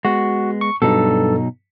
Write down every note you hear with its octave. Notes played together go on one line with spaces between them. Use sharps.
G#3 B3 F#4
C#6
G2 B2 F#3 D#4 A4